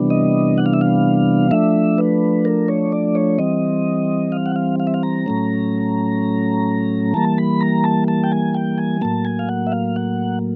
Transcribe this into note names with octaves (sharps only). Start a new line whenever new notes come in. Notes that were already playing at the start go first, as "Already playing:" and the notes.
Already playing: C3 E3 G3 B3 D4
D#5
F#5
F5
E5
F5
F3 A3 D4 E5
B4
A#4
C#5
D5
C#5
E3 G3 C4 D#5
F5
F#5
F5
F5
E5
F5
A#5
A2 F#3 A3 C#4
E3 G3 A#3 A5
B5
A#5
A5
A5
G5
G#5
G5
G#5
A2 F#3 A#3 A5
G#5
F5
F#5
E5
F5
F#5